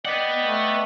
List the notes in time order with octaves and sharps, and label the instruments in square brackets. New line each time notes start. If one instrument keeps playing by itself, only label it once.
[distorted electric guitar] B4 F#5 [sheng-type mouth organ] D5 D#5 G5
[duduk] A3